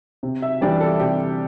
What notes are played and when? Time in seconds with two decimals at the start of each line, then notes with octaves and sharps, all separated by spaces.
0.23 C3
0.42 E5
0.61 E3 G3 D4 G4 D5
0.81 A4
0.99 C3 G4